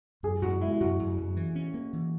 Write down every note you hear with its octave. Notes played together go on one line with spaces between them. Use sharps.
F#2 G#4
F#2 F#4
G#3 E4
E4
F#2 F#4
F#2
F#2
E3
C#4
A#3
E3